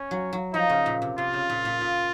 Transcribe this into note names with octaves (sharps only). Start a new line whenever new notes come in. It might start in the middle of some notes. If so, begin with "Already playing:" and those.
Already playing: C#4
F#3
F#3
F3 D#4
C#3
A#2
C3
C3 F4
C#3
A#2
A#2
A#2